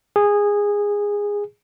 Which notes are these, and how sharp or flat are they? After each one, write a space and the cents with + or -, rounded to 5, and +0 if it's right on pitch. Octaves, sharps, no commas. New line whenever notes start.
G#4 -15